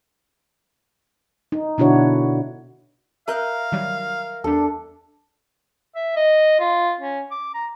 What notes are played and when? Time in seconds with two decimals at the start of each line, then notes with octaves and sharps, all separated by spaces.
1.52 D#4
1.78 B2 D3 D4 E4 F#4 C#5
3.28 A#4 E5 F5 D#6 F#6 G6
3.72 D#3 F#3 G3
4.44 E2 G3 D4 A4
5.96 E5
6.16 D#5
6.60 F4
7.00 C#4
7.31 D6
7.54 A#5